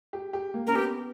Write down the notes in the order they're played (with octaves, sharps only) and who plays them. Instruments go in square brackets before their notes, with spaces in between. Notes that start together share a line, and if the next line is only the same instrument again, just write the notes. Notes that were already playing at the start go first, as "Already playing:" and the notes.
[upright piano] G4
G4
A#3
[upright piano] C#4 [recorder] A#4
[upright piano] B3 [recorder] G4